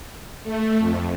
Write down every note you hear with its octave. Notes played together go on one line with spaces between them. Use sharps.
A3
F2